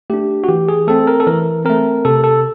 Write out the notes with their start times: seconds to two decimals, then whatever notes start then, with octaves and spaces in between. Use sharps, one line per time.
0.10 A3 D4 G4
0.44 F#4
0.48 E3 G4
0.69 G#4
0.88 A3 C4 A4
1.07 A#4
1.20 A4
1.27 E3 A#4
1.65 A3 C4 A#4
2.05 C3 A4
2.24 A4